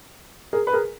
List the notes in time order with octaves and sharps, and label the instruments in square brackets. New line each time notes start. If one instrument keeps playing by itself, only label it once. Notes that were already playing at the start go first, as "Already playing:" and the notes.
[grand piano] G#4 A#4
B4
G#4 A#4